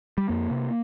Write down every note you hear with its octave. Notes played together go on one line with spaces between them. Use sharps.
G3
F2 A#3
C3